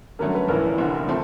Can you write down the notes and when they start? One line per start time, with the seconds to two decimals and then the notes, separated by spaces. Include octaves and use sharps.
0.19 G2 D3 F#3 A3 C#4 A#4
0.35 B4
0.48 A#1 A2 E3 A#4
0.78 F1 F2 D3
1.08 F3 A3 C4